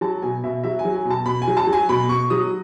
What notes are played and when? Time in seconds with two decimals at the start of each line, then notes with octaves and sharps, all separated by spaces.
0.01 F#3 A5
0.22 B2 G#5
0.44 B2 E5
0.64 F#3 E5
0.79 G#5
0.85 F#3
0.95 G#5
1.05 B2
1.10 A5
1.26 B2 B5
1.42 G#5
1.48 F#3
1.57 A5
1.67 F#3
1.73 G#5
1.89 B2 B5
2.09 B2 C#6
2.30 F#3 D#6